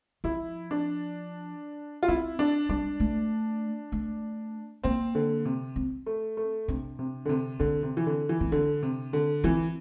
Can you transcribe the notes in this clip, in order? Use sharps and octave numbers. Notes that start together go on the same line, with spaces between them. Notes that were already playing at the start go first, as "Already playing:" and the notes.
F3 E4
D4
F4
C4 E4
D4
G3 D4
A3
A3
A#3 C4
D3
C3
C4
A3
A3
C3 D4
C3
D3
C3
D3 C4
C3
E3
D3
E3
C4
D3 D4
C3
D3
E3 C4